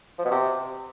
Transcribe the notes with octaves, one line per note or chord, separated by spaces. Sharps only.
F3
B2
C3